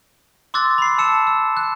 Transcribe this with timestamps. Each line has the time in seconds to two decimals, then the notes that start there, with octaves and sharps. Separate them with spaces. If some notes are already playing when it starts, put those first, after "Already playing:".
0.54 C6 D6 E6 F#6 A6
0.78 B5 C7
0.98 A5 E6 C#7 E7
1.27 E6
1.57 F#6